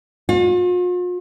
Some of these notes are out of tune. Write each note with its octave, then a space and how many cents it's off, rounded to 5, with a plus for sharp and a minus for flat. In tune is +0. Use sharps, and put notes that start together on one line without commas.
F4 +45